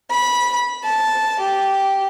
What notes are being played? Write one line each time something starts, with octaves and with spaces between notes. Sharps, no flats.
B5
A5
G4